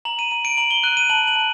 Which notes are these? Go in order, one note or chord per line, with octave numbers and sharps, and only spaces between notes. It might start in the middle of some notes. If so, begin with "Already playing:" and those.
A#5 F#7
D#7
A#5 D#7
D7
A#5 F#7
G7
F#6 D#7
D#7
A5 F#7
F#7
A5